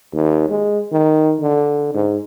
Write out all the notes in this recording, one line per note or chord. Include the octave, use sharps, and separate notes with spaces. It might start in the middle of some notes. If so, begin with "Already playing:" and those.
D#2
G#3
D#3
D3
G#2